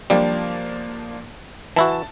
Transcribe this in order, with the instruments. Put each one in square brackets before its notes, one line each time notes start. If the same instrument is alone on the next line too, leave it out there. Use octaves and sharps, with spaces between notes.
[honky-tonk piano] F3 A#3 D4 [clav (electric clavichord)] G3
[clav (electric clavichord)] E3 E4 F#4 [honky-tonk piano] A5